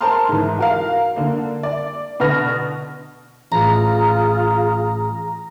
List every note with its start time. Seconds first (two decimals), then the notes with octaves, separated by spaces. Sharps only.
0.01 A#4 C5 A5 A#5 C6 F6
0.29 G#2 E3
0.59 F#4 A#4 F5
1.16 D3 A#3
1.63 D5
2.20 B2 D3 B3 F6 A#6
3.52 A1 F4 G#4 A#5